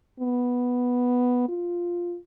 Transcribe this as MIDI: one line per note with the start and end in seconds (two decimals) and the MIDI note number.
0.20 1.45 59
1.49 2.17 65